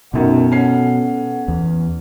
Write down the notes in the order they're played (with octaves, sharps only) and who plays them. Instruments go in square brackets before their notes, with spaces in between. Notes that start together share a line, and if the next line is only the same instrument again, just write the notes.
[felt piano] F#2 D#3 [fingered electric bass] B2 [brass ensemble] B3 A4 F#5
[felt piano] C#4 C7
[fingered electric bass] E2